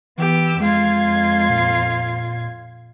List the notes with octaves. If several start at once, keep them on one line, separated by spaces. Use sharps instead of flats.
E3 B3 G4 E6
F2 G#3 F4 G#6
A#2